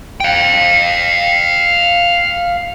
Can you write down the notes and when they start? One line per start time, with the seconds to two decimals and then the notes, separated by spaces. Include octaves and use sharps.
0.20 F5 G5